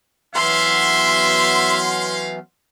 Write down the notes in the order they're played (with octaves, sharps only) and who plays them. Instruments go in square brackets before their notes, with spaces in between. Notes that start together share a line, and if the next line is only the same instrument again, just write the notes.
[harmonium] E3 F#3 B3 [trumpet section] A3 C#4 F5 [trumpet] E5 [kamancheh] C6